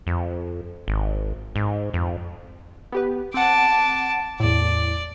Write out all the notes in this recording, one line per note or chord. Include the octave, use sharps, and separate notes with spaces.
F2
G#1
G#2
F2
B3 G4 B4
C4 F#5 A5 D6
E2 A2 D5